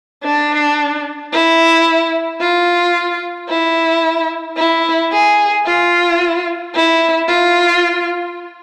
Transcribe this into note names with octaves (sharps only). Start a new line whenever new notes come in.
D4
E4
F4
E4
E4
G#4
F4
E4
F4